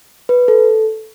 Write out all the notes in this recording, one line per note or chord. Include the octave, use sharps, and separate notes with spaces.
B4
A4